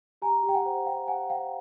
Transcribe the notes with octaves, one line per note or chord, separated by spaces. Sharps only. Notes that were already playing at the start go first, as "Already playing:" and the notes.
G4 G#5 A#5
G4
G5
F#5 G#5
C5
G4 F5 G5
G4 F#5 G#5
C5 F5 G5